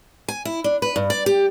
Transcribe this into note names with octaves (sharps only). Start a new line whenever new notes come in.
G#5
E4
D4
B4
G2
D5
G4